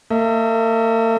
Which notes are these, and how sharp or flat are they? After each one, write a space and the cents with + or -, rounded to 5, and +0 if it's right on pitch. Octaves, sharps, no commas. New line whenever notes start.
A#3 -45 E5 -45